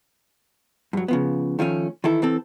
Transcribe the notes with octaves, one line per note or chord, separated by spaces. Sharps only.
G2 F#3
C#3 F3 B3
D#3 F3 A3 C#4
D#3 E3 E4 A4
E3 C4 A4